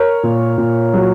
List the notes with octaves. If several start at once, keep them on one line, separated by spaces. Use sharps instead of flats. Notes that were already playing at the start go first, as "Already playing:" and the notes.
Already playing: A#4 C#5
A#2
A#2
F#3